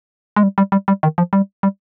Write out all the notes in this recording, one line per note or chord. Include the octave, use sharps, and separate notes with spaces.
G#3
G3
G3
G3
G3
D#3
F3
G3
G3